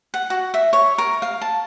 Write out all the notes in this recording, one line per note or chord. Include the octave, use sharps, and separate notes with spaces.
F#5
F#4
E5
C#5
A#4
F5
A5